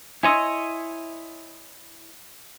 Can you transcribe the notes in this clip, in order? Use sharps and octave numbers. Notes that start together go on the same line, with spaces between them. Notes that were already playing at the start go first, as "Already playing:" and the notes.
E4 C#5 D#5 G#5 C6 E6